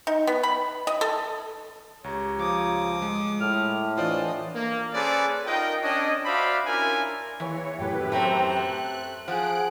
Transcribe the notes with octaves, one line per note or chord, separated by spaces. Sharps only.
D#4
B3
B5
D#5
A4
C#2 G4 C#5 A#5
F3 D6 D#6
G#3
A2 F6
E3 D4 F4 C5 D5 D#5
A#3
C#4 G#4 A4 B4 C5 D5
D#4 F4 A#4 D#5 G5
C#4 D4 C#5 D#5
F#4 C5 D5 E5 F5 B5
C#4 D4 E4 F4 A#4 G#5
D#2 E3 C#5
F#2 A2 G4 B4
F#2 A3 C4 C5 A#5
F#6
F3 G#4 F#5 F#6 D7